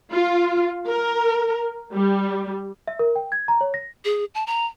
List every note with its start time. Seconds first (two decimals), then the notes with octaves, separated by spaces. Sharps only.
0.12 F4
0.88 A#4
1.93 G3
2.88 E5
2.99 A#4
3.16 G5
3.32 G#6
3.48 A#5
3.61 C#5
3.74 A#6
4.05 G#4
4.35 A5
4.47 A#5